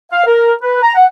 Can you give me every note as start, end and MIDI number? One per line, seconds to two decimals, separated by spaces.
0.12 0.24 77
0.27 0.52 70
0.62 0.77 71
0.82 0.94 82
0.95 1.04 78